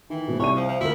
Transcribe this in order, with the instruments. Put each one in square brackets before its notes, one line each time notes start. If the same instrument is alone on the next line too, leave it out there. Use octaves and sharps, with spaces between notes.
[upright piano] D#3 [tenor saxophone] E3
[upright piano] G#2 B2
[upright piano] C2 D5 D#7 [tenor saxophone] C#5
[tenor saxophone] F3
F3
[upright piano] D2 F4 A#4 [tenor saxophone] E4